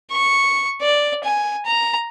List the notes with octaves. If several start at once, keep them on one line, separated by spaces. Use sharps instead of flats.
C#6
D5
G#5
A#5